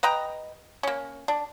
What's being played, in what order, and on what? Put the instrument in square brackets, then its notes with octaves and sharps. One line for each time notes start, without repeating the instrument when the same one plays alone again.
[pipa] B4 D#5 G5 A#5
A#3 C#4
D4